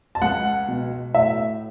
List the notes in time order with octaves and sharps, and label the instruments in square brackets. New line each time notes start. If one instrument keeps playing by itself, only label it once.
[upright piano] A5
C#2 F#5
B2
A2 E5